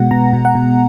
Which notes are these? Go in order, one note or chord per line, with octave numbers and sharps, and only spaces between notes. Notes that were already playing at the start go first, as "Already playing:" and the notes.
Already playing: B2 G#3 B3 F#5
B2 A#5
B2
F#5
B2